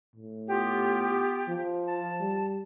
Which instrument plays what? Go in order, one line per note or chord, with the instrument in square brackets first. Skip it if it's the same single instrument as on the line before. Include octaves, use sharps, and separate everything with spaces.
[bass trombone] A2
[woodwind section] B3 F4 G4
[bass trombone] F3
[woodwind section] A5
[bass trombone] G3